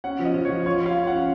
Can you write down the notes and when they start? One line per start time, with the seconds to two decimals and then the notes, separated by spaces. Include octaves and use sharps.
0.04 C#4 F#5
0.19 F3
0.25 D#5
0.34 F3
0.45 C#5
0.50 F3
0.66 F4 C#5
0.81 F4
0.86 F5
0.97 F4
1.07 C#4 F#5